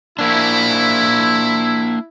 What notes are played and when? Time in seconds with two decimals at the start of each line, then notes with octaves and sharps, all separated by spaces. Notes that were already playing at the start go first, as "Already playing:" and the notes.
0.19 A#3 D4 E4